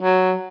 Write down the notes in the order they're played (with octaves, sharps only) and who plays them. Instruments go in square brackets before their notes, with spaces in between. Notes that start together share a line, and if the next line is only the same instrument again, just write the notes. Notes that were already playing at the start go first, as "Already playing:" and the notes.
[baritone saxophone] F#3